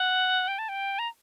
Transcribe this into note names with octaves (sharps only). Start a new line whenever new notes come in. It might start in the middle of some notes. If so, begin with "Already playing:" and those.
Already playing: F#5
G5
A5
G5
A#5